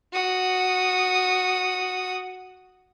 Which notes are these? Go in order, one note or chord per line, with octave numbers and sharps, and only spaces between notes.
F#4 D#6